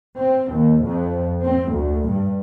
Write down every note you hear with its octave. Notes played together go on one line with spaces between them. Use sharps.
C4
D#2
F2
C4
D2
G2